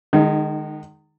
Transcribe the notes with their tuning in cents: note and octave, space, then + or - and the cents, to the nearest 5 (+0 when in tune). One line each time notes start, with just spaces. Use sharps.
D#3 -35 G#3 +0 D#4 +0